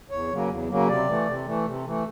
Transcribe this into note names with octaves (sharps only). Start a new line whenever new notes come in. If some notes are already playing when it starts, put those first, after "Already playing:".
E2 C#5
C#3 F#3 A#3
E2
C#3 F#3 A#3
C3 D5
E3 A3
C3
E3 A3
C3
E3 A3